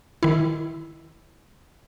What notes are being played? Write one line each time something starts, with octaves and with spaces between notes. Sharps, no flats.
D#3 E4